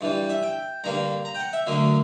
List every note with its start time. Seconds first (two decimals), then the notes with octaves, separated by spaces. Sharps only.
0.01 G2 E3 G3
0.30 E5
0.43 G5
0.84 G2 D3 A#3 A#5
1.25 A#5
1.35 G5
1.39 F#5
1.53 E5
1.67 D2 D3 F#3 A#3